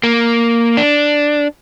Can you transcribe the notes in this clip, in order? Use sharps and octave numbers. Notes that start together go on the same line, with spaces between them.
A#3
D4